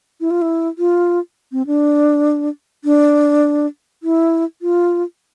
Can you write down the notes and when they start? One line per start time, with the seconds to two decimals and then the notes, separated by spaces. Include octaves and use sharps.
0.21 E4
0.31 F4
0.42 E4
0.78 F4
1.52 C4
1.67 D4
2.84 D4
4.03 E4
4.62 F4